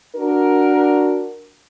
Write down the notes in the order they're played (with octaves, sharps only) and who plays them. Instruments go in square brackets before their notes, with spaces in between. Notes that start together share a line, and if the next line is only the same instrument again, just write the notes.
[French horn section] D4 F#4 A#4